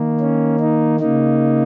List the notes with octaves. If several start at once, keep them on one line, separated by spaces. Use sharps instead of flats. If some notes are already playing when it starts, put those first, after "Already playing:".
Already playing: D#3 A#3
C#4
D#4
C#3 A#3 D#4